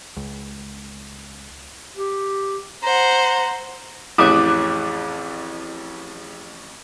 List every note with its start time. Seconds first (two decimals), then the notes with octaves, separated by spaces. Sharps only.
0.16 C#2
1.97 G4
2.83 C5 F#5 A#5
4.18 A1 F2 E4 G#4 C#5 D6 D#6 F#6